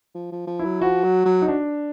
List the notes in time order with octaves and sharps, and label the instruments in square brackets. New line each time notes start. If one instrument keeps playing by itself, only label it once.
[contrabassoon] F3
F3
F3
[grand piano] E4
[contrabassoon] F#3
[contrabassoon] F3 [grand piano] F#4
[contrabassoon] F#3
F#3
[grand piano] D#4
D4